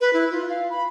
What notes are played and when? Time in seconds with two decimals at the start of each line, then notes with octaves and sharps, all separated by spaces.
0.01 B4
0.13 E4
0.31 F4
0.49 F5
0.70 B5